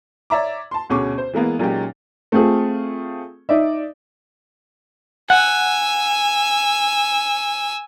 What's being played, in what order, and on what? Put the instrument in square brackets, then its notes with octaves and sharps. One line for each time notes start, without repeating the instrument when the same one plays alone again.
[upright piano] C#5 D5 E5 A#5 D6
A5 C6
D2 B2 C#4 G#4 C#6 D6
C5
E3 G#3 A#3 B3
A#2 F#3 G#3 C#4 D#4 G4
A3 C4 F4 G#4 A4
D#4 D5 E5
[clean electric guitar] F#5 [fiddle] G#5 E6